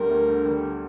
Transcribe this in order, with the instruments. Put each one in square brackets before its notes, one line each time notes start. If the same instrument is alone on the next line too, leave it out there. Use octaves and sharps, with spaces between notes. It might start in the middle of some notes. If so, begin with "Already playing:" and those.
Already playing: [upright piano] D2 G3 [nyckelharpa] A#4
[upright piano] D2
D3
G3